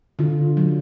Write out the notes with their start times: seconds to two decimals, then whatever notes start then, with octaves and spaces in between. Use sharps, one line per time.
0.19 D3 F4
0.57 F#3